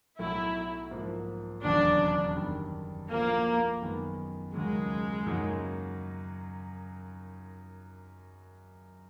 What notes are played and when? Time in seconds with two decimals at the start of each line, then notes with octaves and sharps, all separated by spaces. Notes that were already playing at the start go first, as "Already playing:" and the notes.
0.19 B1 A2 F#3 A3 E4
0.91 G#2 F3 A#3
1.64 E1 D#2 C#3 F#3 D4
2.37 F#2 D#3 G3
3.09 A#1 A2 F3 A3 A#3
3.82 F#2 D#3 G#3 B3
4.54 D#2 C#3 F#3 G#3 A#3
5.26 F#2 C#3 F#3 A#3 D#4